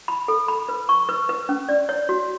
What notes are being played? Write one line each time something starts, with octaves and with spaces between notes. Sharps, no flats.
B5
A4
B5
B4
C#6
B4
B4
C#4
D5
C#5
F#4